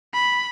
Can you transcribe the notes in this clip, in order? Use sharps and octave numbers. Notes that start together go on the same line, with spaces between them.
B5